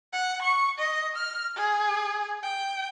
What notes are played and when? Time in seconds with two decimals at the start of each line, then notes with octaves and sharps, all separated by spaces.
0.13 F#5
0.42 C#6
0.78 D#5
1.16 F6
1.56 G#4
2.43 G5